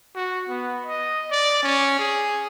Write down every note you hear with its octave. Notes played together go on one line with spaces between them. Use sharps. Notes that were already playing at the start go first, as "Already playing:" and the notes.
F#4
B3
D#5
D5
C#4
G#4